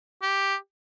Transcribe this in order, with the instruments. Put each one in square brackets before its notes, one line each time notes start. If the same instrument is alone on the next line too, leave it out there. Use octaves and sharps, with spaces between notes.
[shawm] G4